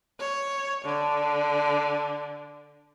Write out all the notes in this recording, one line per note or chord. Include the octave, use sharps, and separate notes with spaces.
C#5
D3